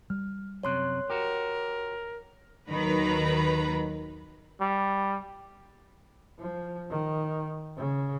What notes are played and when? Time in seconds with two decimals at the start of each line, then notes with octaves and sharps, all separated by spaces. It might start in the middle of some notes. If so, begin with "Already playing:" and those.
0.10 G3 F6
0.63 F#2 C3 C#5 C6 F#6
1.10 F#4 G4 A#4
2.69 D#2 D#3 F#3 B4 A#5 B5
4.61 G3
6.39 F3
6.90 D#3
7.77 C#3